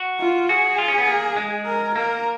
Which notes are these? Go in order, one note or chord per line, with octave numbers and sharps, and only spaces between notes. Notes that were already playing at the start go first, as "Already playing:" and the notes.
Already playing: F#4
F4
F#4 G#4
F4
C#4
B3
A#3
G#3
A#4
A#3 A#4